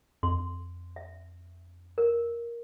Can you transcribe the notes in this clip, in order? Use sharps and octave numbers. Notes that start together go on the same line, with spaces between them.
F2 C6
E5
A#4